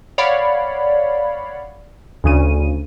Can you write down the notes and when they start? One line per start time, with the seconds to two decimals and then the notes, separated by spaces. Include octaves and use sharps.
0.18 C#5 D5 F5 F#5 B5
2.24 D2 C#3 D#7